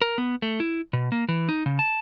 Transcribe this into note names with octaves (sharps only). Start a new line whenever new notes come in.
A#4
B3
A3
E4
B2
A#3
E3
D#4
C#3
A5